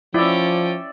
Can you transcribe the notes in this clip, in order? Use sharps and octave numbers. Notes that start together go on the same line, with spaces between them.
F3 C#4 E4 D5 E5 G5